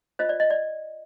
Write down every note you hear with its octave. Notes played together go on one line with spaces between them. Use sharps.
F4 C5 D#5
D5
D#5
D5